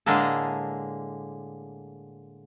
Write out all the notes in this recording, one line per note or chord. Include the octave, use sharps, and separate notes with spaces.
A2 D3 G#3 A#3 G#4 A4